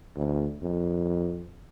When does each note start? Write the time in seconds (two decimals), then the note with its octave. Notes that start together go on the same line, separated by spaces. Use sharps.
0.16 D2
0.62 F2